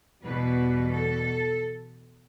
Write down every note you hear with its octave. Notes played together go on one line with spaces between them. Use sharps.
E2 B2 G3 B4
A4